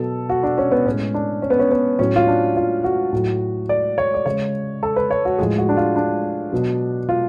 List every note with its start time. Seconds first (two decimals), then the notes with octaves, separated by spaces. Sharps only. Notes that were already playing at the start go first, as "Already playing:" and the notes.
Already playing: B2 F#3 A4
0.29 F#4
0.43 D4
0.58 C#4
0.71 B3
0.86 A2 G#3 C#4
1.14 D4
1.42 C#4
1.50 B3
1.59 C#4
1.71 B3
1.99 A2 F#3 C#4
2.16 F4
2.28 D4
2.56 F4
2.84 F#4
3.13 A2 F#3
3.69 D5
3.98 C#5
4.14 D5
4.26 C#3 G#3 C#5
4.83 A4
4.96 B4
5.11 C#5
5.25 F#4
5.38 A2 F3 G#3 G#4
5.58 F#4
5.69 D4
5.77 F4
5.96 D4
6.52 B2 F#3
7.09 F4